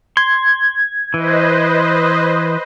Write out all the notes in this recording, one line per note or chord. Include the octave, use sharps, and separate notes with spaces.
C6 G#6
E3 B4 C5 D#5